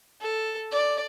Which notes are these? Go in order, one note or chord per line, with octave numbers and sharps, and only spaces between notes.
A4
D5